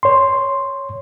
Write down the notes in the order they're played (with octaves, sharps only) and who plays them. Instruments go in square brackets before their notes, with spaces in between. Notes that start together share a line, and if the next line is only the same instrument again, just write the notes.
[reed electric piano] C#5 C6